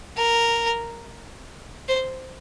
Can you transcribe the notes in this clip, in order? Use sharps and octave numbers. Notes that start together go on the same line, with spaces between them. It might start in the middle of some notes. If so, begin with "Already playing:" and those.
A#4
C5